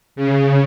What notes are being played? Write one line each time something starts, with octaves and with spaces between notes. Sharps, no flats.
C#3